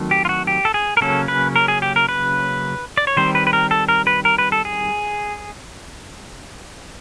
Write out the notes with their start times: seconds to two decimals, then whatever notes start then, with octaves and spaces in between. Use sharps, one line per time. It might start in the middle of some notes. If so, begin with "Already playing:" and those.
Already playing: D#3 F#3 A3 C4
0.11 G4
0.25 F4
0.29 F#4
0.47 G4
0.65 A4
0.74 G#4
0.97 A#4
1.01 C#3 F#3 A#3 C#4 A4
1.28 B4
1.56 A#4
1.68 G#4
1.82 G4
1.96 A#4
2.09 B4
2.98 D5
3.07 C#5
3.17 D#3 G3 C4 C5
3.35 B4
3.47 B4
3.53 A#4
3.71 A4
3.89 A#4
4.07 B4
4.25 A#4
4.38 B4
4.52 A4
4.65 G#4